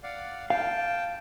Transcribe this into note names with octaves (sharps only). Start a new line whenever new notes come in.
D5 F5 F#5
F5 G5 A5